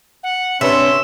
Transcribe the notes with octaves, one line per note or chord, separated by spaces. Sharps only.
F#5
C3 C#4 D4 B4 E5 C6